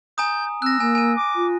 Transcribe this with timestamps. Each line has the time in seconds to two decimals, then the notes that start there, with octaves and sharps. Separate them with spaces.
0.18 G#5 A#5 D#6 G6
0.62 C4 E6 F#6 A#6
0.80 A#3 G#5
0.95 G#5 D#7
1.16 D6
1.35 F4